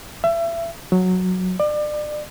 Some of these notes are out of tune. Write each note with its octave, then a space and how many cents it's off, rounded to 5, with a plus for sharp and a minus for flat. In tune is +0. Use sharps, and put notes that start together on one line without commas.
E5 +30
F#3 -10
D5 +30